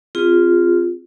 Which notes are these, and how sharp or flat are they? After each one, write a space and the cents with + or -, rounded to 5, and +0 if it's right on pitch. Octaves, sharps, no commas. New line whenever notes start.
C4 +0 F4 +0 G#4 -25